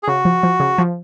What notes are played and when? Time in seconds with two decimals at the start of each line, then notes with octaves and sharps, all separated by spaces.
0.03 G#4
0.08 C#3 F#4
0.25 F3
0.43 F3
0.60 C#3
0.78 F3